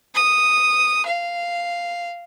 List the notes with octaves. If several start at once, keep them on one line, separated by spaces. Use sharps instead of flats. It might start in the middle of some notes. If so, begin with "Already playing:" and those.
D#6
F5